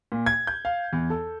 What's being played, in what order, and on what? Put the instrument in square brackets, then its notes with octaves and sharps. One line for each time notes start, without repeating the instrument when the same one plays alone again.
[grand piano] A#2
G#6
G6
F5
E2
A4